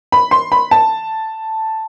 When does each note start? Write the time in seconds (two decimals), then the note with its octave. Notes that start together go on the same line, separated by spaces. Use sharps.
0.12 B5
0.31 C6
0.52 B5
0.71 A5